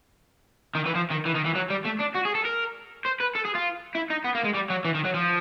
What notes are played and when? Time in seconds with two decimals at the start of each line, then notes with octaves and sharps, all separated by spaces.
0.75 D#3
0.86 E3
0.95 F3
1.10 D#3
1.25 E3
1.35 D#3
1.45 E3
1.55 F#3
1.70 G3
1.85 A3
2.00 D4
2.15 F#4
2.25 G#4
2.35 A4
2.45 A#4
3.05 C5
3.20 B4
3.35 A4
3.45 G#4
3.55 F4
3.95 E4
4.10 D#4
4.24 B3
4.35 A#3
4.44 G#3
4.54 G3
4.70 F#3
4.85 E3
4.95 D#3
5.05 F#3
5.15 F3